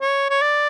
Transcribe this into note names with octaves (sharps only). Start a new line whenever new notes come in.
C#5
C#5
D5